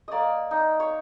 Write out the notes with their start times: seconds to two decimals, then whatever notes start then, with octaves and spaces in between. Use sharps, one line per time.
0.08 A#3 D5 D#5
0.51 D#4
0.80 C#5